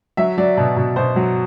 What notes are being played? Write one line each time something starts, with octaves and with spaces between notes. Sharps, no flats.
F#3 E5
F#3 D5
B2
B2
B2 C5
F#3